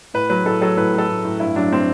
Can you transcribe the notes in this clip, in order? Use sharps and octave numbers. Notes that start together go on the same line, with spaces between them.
A2 B4
F#3 B4
A2 A4
F#3 A4
A2 B4
F#3
A4
A2
A2
G2 E4
F#3 D4
C4